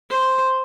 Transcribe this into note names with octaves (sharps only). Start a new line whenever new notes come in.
C5